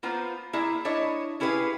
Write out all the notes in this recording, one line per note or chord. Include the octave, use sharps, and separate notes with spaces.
A#3 B3 F4 C5 A#5
A#3 E4 G#4 D5 E5
D4 E4 C#5 D#5
C#4 E4 G4 G#4 B4 F5